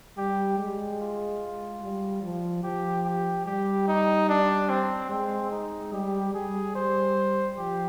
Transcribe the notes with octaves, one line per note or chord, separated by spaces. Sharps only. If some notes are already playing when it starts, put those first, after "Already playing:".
G3 G4
G#3 G4
F4
G3
F3
F3 G4
G4
G3 G4
D#4
D4
C4
G#3 C4
D#4
G3 G4
G3 G#4
G3 C5
F3 G4